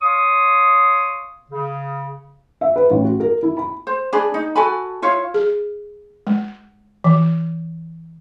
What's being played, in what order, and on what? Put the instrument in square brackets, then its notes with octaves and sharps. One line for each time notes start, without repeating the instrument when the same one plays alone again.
[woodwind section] C#5 F5 C6 C#6 D#6
C#3
[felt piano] E5
B4
A1
F#4
A#4
E4
B5
[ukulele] C5
D4 G#4 B5
D#4
F#4 A4 G#5 B5
E4 F4 C#5 F5
[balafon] G#4
G#3
E3